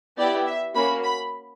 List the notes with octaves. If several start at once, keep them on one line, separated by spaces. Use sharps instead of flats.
B3 E4 G4 D5
E5
A#3 C#4 F#4 B5
B5